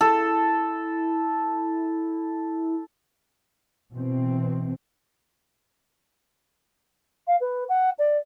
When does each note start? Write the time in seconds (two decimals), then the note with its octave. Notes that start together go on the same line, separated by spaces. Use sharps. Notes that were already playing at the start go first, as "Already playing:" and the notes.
0.01 E4 A4
3.93 B2 E3 C4
7.27 F5
7.41 B4
7.69 F#5
7.99 D5